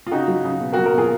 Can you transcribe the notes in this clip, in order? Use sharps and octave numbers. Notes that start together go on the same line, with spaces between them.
F4
C#3 D#4 F#4
F#3
C#3
B2
F#4 A#4
F#3
F#4 A#4
B2 F4 G#4